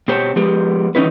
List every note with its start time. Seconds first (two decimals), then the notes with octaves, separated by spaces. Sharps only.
0.08 B2 G4 C5 C#5 A5
0.36 F3 G#3 B3 G4
0.95 D#3 E3 C#4 D#4 E4 B4